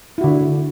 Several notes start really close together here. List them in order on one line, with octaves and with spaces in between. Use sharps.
E4 F#4 D3